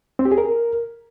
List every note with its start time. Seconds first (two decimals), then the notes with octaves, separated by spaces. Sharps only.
0.19 C4
0.25 G4
0.32 G#4
0.38 A#4